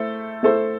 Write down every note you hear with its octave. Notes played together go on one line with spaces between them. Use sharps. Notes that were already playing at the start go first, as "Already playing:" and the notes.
Already playing: A3 E4 A4 C5
A3 E4 A4 C5